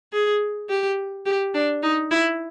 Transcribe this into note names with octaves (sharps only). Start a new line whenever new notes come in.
G#4
G4
G4
D4
D#4
E4